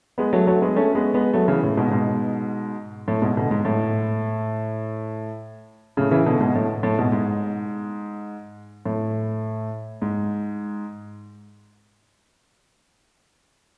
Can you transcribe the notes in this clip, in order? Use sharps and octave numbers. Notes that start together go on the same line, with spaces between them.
G#3 B3
F#3 A3
F#3 A3
G#3 B3
A3 C#4
G#3 B3
G#3 B3
F#3 A3
C#3 E3
A2 C#3
G#2 B2
G#2 B2
A2
G#2 B2
B2 D3
G#2
A2
A2 C#3
C#3 E3
B2 D3
G#2 B2
A2
A2
G#2 B2
G#2
A2
G#2